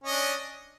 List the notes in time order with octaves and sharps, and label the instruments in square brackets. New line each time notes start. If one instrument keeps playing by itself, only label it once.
[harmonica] C#4
D#5
D4